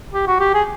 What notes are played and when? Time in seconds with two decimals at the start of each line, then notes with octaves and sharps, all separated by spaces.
0.14 G4
0.27 F#4
0.40 G4
0.54 G#4